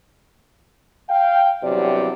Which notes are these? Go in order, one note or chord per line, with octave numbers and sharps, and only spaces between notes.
F5 G5
E2 G2 C3 F#3 D5